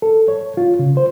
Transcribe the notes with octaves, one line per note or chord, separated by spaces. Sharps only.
A4
C#5
F4
C#3
C5